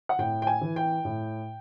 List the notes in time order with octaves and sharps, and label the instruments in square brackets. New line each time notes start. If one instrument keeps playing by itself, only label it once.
[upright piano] F#5
A2 G5
G5
G#5
E3
G5
A2